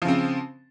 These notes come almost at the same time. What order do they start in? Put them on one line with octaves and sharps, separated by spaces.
F3 C#3 C4